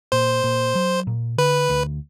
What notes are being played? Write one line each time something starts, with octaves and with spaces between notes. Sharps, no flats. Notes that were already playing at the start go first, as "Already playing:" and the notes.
A#2 C5
A#2
F#3
A#2
D3 B4
D2